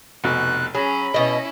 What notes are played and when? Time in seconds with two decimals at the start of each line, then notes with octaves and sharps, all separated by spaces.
0.24 F1 B2 F#6
0.75 F#3 C#4 G#4 B5
1.14 B2 C#4 E4 D#5